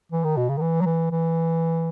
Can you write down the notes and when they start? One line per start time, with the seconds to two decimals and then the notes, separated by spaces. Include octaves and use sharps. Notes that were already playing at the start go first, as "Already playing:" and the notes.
0.12 E3
0.24 D#3
0.37 B2
0.49 C#3
0.57 D#3
0.61 E3
0.81 F#3
0.86 E3
1.11 E3